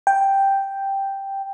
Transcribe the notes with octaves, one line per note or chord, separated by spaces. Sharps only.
G5